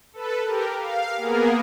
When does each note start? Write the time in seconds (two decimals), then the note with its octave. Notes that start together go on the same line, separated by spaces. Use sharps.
0.13 A4 B4
0.45 G4 A#4
0.76 F5
1.17 A#3 B3 G#4 A#4